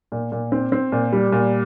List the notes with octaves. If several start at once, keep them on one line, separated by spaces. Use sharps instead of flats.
A#2
A#2
C4
C4
A#2
G3
A#2